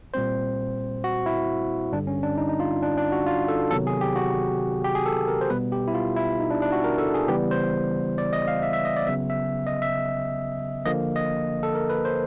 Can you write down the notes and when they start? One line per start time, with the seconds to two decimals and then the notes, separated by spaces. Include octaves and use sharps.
0.14 A#2 G3 C4 C5
1.04 F#4
1.26 E4
1.93 G2 D3 G3 D4
2.07 C#4
2.23 D4
2.38 D#4
2.49 D#4
2.60 F4
2.83 D4
2.97 D4
3.12 F#4
3.26 F4
3.48 A4
3.71 C3 D#3 F#3 B3 A4
3.87 G#4
4.01 G4
4.16 F#4
4.85 G4
4.95 G#4
5.06 A4
5.28 A#4
5.41 C5
5.50 B2 G3 B3 B4
5.72 G4
5.88 E4
5.94 F4
6.16 E4
6.40 D#4
6.50 D4
6.62 D4
6.72 F#4
6.84 A#4
6.98 A4
7.14 G#4
7.28 C#3 E3 G3 B3 G4
7.51 C5
8.18 D5
8.33 D#5
8.48 F5
8.62 E5
8.73 E5
8.85 D#5
8.97 D5
9.07 C#3 F#3 B3 E5
9.30 E5
9.67 D#5
9.82 E5
10.86 D3 F3 A#3 D#5
11.16 D#5
11.63 A4
11.75 A#4
11.90 B4
12.05 C5